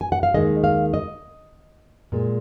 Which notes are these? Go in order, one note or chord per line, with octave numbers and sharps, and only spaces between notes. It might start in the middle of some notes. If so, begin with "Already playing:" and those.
G#5
F#5
F5
D#2 D#3 G#3 D#5
F5
D#5
A#2 G#3